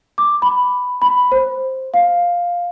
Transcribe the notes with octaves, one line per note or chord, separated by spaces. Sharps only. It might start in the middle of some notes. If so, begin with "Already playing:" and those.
D6
B5
B5
C5
F5